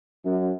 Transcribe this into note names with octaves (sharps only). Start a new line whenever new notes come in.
F#2